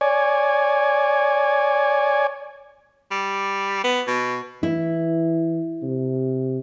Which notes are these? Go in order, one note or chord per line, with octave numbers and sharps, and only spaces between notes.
C#5 D5 G#5
G3
B3
B2
E3 E4
C3